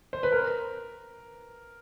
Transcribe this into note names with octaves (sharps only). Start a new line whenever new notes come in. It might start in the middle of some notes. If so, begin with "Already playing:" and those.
C5
B4
A#4